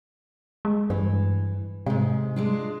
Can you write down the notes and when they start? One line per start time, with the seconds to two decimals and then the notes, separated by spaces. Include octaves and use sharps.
0.65 G#3
0.90 G2 E3
1.86 G#2 C3 G#3
2.36 G#3 D4 F4